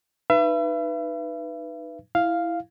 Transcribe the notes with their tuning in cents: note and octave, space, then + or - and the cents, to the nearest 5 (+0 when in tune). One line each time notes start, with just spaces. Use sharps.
D#4 -15 B4 +0 E5 +40
E4 +0 F5 +0